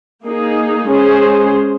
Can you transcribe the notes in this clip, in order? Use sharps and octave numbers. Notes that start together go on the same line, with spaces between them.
A#3 D#4 G#4
G#3 C#4 G#4 C5